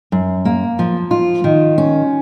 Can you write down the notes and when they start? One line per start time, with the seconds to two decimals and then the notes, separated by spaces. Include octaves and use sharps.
0.12 F#2
0.45 A#3
0.79 F3
1.11 F4
1.44 D#3
1.78 C#4